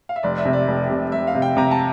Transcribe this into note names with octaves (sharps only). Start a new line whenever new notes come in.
F5
E5
F1 D5
E5
C3
D5
F1
C3
F1 E5
F5
C3
G5
C3 A#5
A5